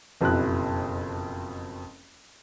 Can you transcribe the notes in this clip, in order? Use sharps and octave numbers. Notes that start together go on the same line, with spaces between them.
F#1 F2 B2 E4 F#6